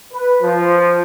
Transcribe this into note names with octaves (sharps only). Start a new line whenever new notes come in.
B4
F3